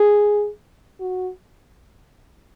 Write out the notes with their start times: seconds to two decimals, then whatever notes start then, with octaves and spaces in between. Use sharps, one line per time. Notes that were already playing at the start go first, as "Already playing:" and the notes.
Already playing: G#4
1.00 F#4